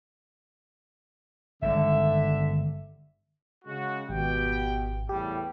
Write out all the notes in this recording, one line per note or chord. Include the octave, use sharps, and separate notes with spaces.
G1 D3 D#3 G#3 E5
C#3 G#3 F#4
G#1 B2 G4 G5
E2 A2 G3 G4